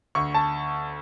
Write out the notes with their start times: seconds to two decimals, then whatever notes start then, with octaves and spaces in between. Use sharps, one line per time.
0.15 D2 C#6
0.34 A5